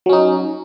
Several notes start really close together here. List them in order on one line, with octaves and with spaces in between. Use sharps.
F#3 C#4 D#4